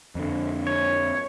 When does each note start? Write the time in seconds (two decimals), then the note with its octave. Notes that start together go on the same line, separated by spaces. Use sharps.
0.15 F2 D3
0.67 C#5